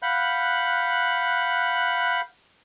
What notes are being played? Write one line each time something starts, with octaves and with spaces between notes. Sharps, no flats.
F5 F#5 B5 F#6 G6